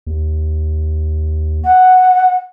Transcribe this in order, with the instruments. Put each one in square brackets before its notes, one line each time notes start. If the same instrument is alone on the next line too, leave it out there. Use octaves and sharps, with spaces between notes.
[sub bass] D#2
[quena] F#5